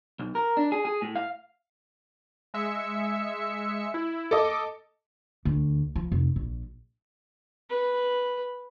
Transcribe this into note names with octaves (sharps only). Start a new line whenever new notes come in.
B1
A#4
D4
G#4
G#4
A2
F5
G#3 E5 C#7
E4
A4 D#5 D6
D2
F3
F1
A#1
B4